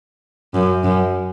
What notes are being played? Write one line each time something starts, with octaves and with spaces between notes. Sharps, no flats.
F#2
F#2